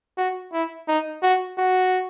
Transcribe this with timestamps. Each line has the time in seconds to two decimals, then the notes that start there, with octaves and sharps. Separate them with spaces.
0.18 F#4
0.53 E4
0.88 D#4
1.23 F#4
1.58 F#4